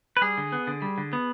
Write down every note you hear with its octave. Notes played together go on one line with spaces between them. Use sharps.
B4
G3 G#4
D3
B3
D3
G3
D3
B3